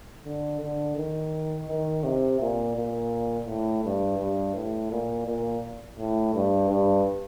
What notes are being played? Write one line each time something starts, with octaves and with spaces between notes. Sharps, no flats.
D3
D3
D#3
D#3
C3
A#2
A#2
A2
G2
G2
A2
A#2
A#2
A2
G2
G2